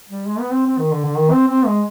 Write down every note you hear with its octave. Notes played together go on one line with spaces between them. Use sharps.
G3
G#3
B3
C4
C4
D#3
D3
D3
D#3
C4
C4
G#3